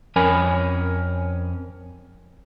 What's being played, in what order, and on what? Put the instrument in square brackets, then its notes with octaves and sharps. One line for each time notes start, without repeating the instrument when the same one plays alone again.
[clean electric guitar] F2 C#4 A#4 G#5 B5